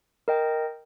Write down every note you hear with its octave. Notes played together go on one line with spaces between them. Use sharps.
A#4 D#5 G5